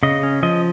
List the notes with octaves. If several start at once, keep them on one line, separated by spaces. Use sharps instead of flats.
C#3 D#5
C#4
F3 D#5